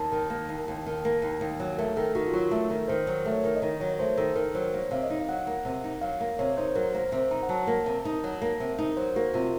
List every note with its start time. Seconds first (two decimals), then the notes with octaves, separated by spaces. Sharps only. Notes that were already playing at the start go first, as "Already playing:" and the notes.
Already playing: D#2 A5
0.12 D#3
0.30 A#3
0.49 D#2
0.68 D#2
0.86 D#3
1.05 A#3
1.22 D#2
1.41 D#2
1.60 F#3
1.78 A3 A#4
1.97 D#3 A4
2.15 D#3 F#4
2.28 F4
2.34 F#3 F#4
2.51 A3 A4
2.70 D#3 A#4
2.88 D#3 C5
3.07 F#3 C#5
3.25 A3
3.32 C#5
3.44 D#3
3.56 D#5
3.62 D#3
3.80 F#3 C#5
3.99 A3 C5
4.17 D#3 A4
4.36 D#3 A#4
4.55 F#3 C5
4.74 A#3
4.79 C#5
4.91 C3 F5
5.04 D#5
5.10 D#4
5.20 F5
5.28 F#3 F#5
5.47 A#3
5.65 C3
5.84 D#4
6.01 F#3 F5
6.20 A#3 F5
6.39 C3 C#5
6.57 D#4 C5
6.75 F#3 A#4
6.94 A#3 C5
7.12 C3 C5
7.31 D#4 A#5
7.43 F#5
7.49 F#3 A5
7.67 A#3
7.86 C3
8.05 D#4
8.24 F#3
8.42 A#3
8.60 C3
8.79 D#4
8.91 A#4
8.97 F#3 C5
9.16 A#3 F#4
9.34 C3 F4